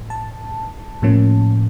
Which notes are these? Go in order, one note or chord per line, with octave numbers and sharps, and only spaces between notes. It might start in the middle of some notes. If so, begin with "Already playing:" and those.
Already playing: A2
A5
A2 F3 A#3 C#4